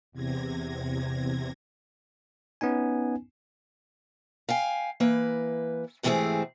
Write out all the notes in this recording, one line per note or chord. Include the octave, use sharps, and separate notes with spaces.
E2 C3 G#6 A#6
B3 C#4 D#4 G#5
F5 G5 G#5
E3 A#3 B4
G#2 C3 E3 A3 C4 G#4